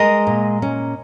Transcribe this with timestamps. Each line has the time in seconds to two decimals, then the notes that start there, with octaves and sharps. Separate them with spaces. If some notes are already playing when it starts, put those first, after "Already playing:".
Already playing: G#3 A#4 D#5
0.27 A#2
0.62 C#4